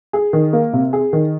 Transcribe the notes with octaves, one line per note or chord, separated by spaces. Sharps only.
G#4
D#3
A#3
C3
G#4
D#3